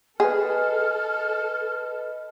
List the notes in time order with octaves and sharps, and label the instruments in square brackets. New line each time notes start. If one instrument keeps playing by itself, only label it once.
[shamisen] G#4 [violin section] A4 [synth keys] B4 D#5 [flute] F6